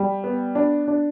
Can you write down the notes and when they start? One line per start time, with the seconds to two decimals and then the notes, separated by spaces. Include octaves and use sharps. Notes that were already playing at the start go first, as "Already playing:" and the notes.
Already playing: G3
0.24 B3
0.55 D4
0.88 D4